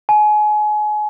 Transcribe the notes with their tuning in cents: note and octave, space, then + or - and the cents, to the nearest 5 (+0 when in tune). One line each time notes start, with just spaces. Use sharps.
G#5 +30